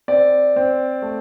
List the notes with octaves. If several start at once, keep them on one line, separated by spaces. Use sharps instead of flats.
C4 D5
C4
A3